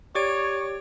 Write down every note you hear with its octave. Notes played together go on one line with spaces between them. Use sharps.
G4 C#5 D5 D7